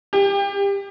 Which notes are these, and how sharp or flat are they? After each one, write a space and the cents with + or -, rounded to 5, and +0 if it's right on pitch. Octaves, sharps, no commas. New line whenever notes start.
G4 +30